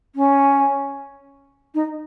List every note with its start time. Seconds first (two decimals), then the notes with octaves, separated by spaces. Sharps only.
0.15 C#4
1.74 D#4